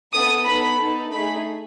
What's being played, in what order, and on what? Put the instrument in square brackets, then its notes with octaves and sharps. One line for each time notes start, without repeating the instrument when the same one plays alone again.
[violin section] B3 E4 A4 D#6
B3 D#4 A4 B5
B3 D#4 A4
A3 D#4 G#4 B5